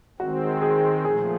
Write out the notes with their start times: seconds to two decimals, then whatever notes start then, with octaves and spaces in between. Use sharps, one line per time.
0.19 D#3 G#3 C4 F#4
0.62 G#4
1.05 A#2 F3 A3 G#4